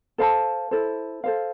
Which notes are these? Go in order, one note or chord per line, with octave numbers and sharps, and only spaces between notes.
A4 C5 F5 A5
E4 A4 C5
A4 C5 F5